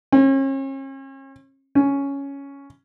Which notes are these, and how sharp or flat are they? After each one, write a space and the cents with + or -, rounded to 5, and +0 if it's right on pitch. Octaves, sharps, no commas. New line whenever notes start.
C#4 -40
C#4 +5